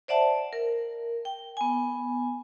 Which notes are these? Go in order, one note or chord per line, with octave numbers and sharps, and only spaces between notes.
C5 D5 E5 F#5 A5
A#4
G5
B3 G#5